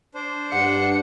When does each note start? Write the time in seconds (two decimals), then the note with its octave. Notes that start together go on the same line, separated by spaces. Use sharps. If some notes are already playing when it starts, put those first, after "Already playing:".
0.14 D4 C5
0.52 G2 F#5 C#7